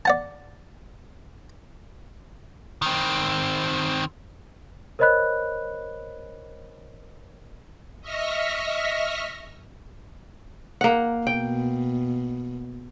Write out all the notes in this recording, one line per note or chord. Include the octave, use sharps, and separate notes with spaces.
D5 F#5 A5
D#3 C4
A#4 C5 C#5 D#5 B5 F#6
D#5 E5 C#6 F6 A#6 B6
A#3 F#5
B2 G5